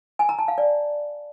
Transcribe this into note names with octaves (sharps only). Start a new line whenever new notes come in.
G#5
A#5
A5
F5
D5